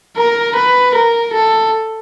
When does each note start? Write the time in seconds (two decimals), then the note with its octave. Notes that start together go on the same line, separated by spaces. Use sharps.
0.17 A#4
0.56 B4
0.95 A#4
1.34 A4